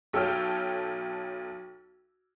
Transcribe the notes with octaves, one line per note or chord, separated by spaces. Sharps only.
B1 A4 C#5 G5 E6 F6